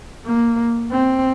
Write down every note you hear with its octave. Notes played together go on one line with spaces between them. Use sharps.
A#3
C4